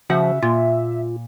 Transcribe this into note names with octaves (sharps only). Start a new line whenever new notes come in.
C#3 F3 F#4 E5 F#5
A#2 F4